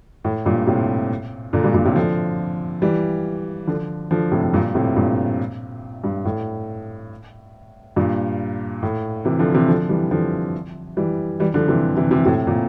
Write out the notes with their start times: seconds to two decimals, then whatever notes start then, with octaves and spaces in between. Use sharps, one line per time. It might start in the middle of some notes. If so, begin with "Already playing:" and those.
0.25 A2
0.46 G2 A#2
0.67 A2 C3
1.53 A#2 D3
1.64 G2 A#2
1.74 G2 A#2
1.85 A2 C3
1.96 D3 F3
2.82 E3 G3
3.67 D3 F3
4.11 D3 F3
4.31 A2 C3
4.43 A2
4.54 G2 A#2
4.75 A2 C3
4.96 G2 A#2
6.04 G2
6.25 A2
7.96 G2 A#2
8.83 A2
9.25 C3 E3
9.39 D3 F3
9.54 C3 E3
9.68 D3 F3
9.89 E3 G3
10.11 D3 F3
10.97 E3 G3
11.40 E3 G3
11.54 D3 F3
11.68 C3 E3
11.97 C3 E3
12.11 C3 E3
12.25 A2 C3
12.47 A#2